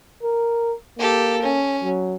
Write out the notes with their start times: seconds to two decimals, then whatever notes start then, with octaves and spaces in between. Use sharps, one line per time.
0.23 A#4
0.99 A#3 G4 A4
1.41 C#4
1.83 F#3